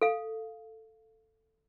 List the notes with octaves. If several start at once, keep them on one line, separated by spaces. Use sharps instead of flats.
A4 F5